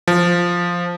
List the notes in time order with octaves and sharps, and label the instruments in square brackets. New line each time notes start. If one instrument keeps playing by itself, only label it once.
[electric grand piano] F3